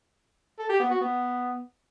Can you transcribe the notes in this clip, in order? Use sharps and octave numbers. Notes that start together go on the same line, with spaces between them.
A4
G4
B3
F#4
B3